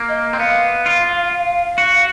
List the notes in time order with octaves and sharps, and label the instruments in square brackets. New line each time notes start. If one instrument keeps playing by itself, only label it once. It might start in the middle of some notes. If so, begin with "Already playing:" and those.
Already playing: [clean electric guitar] A#3
[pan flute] D#5
[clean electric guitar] C4
[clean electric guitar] B3 [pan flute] F5
[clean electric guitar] F4
F#4